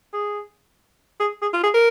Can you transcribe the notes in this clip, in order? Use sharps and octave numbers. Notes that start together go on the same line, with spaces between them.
G#4
G#4
G#4
F4
G#4
A#4